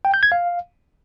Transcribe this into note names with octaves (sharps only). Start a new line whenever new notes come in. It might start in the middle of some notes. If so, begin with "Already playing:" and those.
G5
G6
G#6
F5